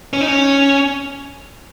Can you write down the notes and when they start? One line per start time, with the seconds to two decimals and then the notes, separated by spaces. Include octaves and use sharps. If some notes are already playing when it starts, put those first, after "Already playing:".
0.13 C#4
0.21 D#4
0.28 C#4